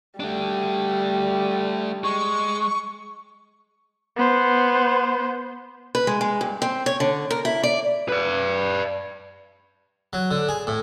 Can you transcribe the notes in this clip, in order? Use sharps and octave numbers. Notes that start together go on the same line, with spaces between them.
G3 A3 D4
G#3 C#6
B3 C5
B4
G#3
G#3
G2
C4
C#5
D3
A#4
E4
D5
B4 D5
F#3
D3
G#4
A2